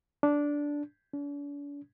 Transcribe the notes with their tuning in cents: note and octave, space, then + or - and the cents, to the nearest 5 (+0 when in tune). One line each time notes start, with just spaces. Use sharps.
D4 -10
D4 -45